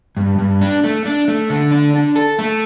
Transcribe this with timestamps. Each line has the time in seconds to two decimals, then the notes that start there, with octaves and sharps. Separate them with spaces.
0.17 G2
0.39 G2
0.61 D4
0.84 A3
1.06 D4
1.28 A3
1.50 D3
1.71 D4
1.94 D4
2.16 A4
2.39 A3